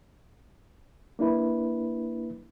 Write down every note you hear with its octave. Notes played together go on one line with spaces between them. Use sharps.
A#3 D4 E4 B4